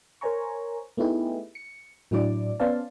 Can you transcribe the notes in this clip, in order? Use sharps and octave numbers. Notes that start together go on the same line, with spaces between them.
A#4 C5 C#5 G#5 A#5 C#6
A3 B3 D#4 E4 G4 G#4
C#7
A2 F#3 D4 E4 D5 D6
B3 C#4 C5 D5 F5 A5